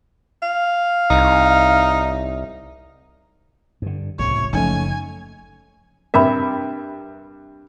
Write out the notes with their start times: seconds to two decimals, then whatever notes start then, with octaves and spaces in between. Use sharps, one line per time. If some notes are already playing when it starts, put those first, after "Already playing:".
0.43 F5
1.10 C2 D#4
3.82 G2 D3
4.19 G1 C#2 A2 C3 C#5
4.53 F#1 F3 A3 C#4 D#4 G#5
6.14 G2 C3 A#4 E5 B5